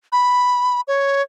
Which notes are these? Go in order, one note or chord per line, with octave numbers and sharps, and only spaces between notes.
B5
C#5